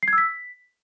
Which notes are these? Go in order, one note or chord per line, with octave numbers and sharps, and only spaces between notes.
C7
G#6
E6
B6